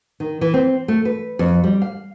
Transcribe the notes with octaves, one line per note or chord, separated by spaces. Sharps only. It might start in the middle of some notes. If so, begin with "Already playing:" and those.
D#3
E3
C4
A3
B4
F2
G3
F5